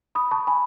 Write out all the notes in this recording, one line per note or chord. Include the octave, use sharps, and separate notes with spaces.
B5 D#6
A5 C#6
G#5 B5